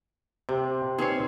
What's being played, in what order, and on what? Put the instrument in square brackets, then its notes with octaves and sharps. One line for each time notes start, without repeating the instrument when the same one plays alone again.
[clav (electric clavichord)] C3 [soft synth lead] G4 [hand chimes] C5 C6
[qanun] C4 [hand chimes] D#4 B4 C7 [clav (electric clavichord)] G#4 C#5